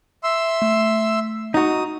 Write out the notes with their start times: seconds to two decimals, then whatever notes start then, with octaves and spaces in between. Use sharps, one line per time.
0.24 E5 C6 E6
0.62 A3
1.54 D#4 F#4 A#5 D#6